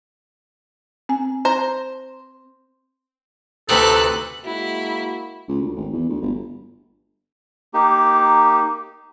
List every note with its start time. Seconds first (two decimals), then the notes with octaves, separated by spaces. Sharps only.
1.09 C4 G#5
1.45 C5 A#5
3.69 D2 C3 D#4 A4 B4 F#6
4.44 G#3 A#3 E4 F#4
5.48 C#2
5.62 D2
5.77 G#1
5.93 E2
6.09 D2
6.22 G1
7.74 A#3 D#4 G4